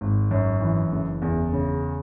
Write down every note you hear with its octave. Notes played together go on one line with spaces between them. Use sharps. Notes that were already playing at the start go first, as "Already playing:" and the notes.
G#1
F#2
E3
F#1
E2
C#3